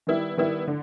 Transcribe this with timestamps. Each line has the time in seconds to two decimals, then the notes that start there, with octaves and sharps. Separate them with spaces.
0.07 D#3 G3 B3 E4
0.37 D#3 G3 B3 E4
0.67 D3